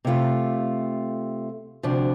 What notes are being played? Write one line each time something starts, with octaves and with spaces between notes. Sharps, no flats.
C3 A3 F4
D2 C3 F3 D4